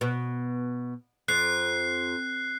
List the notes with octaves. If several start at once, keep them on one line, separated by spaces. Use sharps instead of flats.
B2
F2 F#6 C7